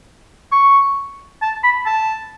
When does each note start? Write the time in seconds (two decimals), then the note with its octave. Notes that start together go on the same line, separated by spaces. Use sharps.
0.52 C#6
1.42 A5
1.63 B5
1.86 A5